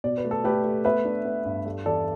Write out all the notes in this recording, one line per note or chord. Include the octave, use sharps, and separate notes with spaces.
B2 D5
B4
A3
A4
A3 G4 B4
A3
B3 B4 E5
D4
B3
G2
G3 A4
E2 A4 D5